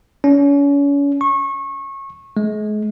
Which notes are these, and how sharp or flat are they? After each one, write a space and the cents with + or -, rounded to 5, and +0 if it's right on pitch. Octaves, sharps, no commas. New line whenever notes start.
C#4 +35
C#6 -25
G#3 +35